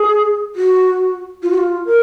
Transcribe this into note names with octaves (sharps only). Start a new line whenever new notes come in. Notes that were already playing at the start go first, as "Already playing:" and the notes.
Already playing: G#4
F#4
F4
F#4
F4
A#4